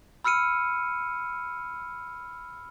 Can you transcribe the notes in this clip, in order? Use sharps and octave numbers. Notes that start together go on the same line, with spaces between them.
B5 E6 F6 C#7 D#7